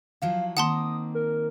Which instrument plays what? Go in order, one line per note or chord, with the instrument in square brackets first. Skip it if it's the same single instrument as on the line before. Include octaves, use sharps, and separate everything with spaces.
[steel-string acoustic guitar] F3 F#3 E4 [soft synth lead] F5
[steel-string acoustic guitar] D#3 A#3 C4 [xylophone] F#5 A5 C6 [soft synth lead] D#6
[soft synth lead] A#4